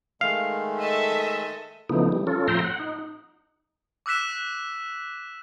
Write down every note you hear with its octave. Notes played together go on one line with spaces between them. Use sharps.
D#3 G#3 A3 F5
A4 D#5 E5
C#3 E3 F3 A3 B3 D#4
E3 G3
C#4 F4 A4
A2 F3 E5 G5 A#5 C6
F#5
D#4
D6 E6 F#6 B6 E7